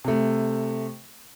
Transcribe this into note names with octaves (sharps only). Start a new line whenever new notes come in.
C3 A3